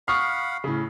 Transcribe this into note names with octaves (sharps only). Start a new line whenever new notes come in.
F5 F#5 B5 C#6 D#6 F6 C7
A2 C#3